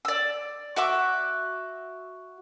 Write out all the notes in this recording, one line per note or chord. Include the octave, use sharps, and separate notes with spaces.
D5 E6
F#4 E5 D6